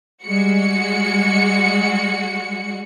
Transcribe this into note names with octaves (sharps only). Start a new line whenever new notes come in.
G3 G#3 F#4 C#7